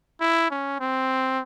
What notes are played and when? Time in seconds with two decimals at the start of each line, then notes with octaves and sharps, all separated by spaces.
0.21 E4
0.51 C#4
0.80 C4